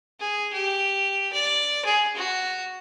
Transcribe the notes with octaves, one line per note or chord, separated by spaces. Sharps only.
G#4
G4
D5
G#4
F#4